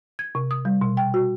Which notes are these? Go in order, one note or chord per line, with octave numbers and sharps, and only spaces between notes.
G#6
C3
D#6
G3
B2
G5
F#4